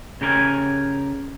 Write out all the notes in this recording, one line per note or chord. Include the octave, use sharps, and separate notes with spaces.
C#3 G4 A#4 C#5 G#5